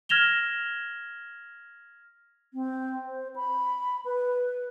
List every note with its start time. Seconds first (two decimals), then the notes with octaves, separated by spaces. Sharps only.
0.09 F6 G#6 A#6 E7 F7 G7
2.54 C4
3.06 C5
3.36 B5
4.05 B4